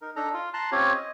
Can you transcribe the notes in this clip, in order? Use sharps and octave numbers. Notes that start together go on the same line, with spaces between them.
D#4 A#4
D4 D#4 A4 A#5
F4
A5 A#5 C6 F#6
C4 C#4 F4 G4 C#5
D#5